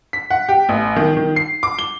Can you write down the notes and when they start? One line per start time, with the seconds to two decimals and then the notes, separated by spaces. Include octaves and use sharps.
0.13 B6
0.30 F#5
0.49 G4
0.69 A1
0.96 D#3
1.17 D#3
1.36 C7
1.63 D6
1.79 G7